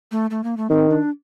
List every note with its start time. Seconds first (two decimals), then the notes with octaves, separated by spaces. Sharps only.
0.11 A3
0.30 A3
0.44 A#3
0.57 A3
0.69 D#3 C4
0.89 D4